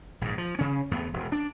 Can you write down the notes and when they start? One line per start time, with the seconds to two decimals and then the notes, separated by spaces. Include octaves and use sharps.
0.21 A#1 G#2
0.38 F3
0.59 C#3 C#4
0.91 E2 A3 B3
1.13 E1
1.32 D4